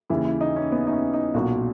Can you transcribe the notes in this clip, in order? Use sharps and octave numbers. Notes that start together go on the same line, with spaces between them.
D#2 C#3 E3 E4
E4
D#4
C#4
B3
D#4
C#4
D#4
B1 A#2 F#3 F#4